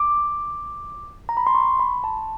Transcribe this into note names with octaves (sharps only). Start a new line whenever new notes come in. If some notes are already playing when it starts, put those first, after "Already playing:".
Already playing: D6
A#5
B5
C6
C#6
B5
A5